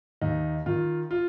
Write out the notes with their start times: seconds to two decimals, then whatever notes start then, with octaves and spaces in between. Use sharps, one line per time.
0.21 D#2 D#4
0.66 D#3 F4
1.11 F4